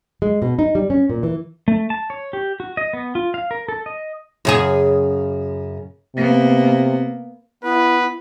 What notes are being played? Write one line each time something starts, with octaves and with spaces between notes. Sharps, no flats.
G#3
B2
D#4
G3
C#4
A#2
E3
A3
A5
C#5
G4
F#4
D#5
B3
F4
F5
A#4
A4
D#5
F#2 C#3 G#4
C3 A#3 B3
B3 E4 B4